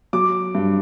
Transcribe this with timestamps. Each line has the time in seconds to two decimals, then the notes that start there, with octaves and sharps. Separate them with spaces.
0.13 F#3 D6
0.55 G2